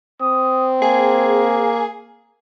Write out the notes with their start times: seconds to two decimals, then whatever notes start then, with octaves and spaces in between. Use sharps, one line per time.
0.22 C4 D#6
0.82 A#3 G#4